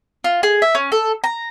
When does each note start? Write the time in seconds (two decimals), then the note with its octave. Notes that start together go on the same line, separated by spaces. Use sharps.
0.24 F4
0.43 G#4
0.62 E5
0.75 C#4
0.92 A4
1.24 A#5